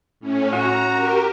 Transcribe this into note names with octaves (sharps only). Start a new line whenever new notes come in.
A2 C#4
F#4 A#5
G4 A#4